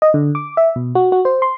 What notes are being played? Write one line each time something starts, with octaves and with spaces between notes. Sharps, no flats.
D#5
D3
D6
E5
B2
F#4
F#4
C5
C6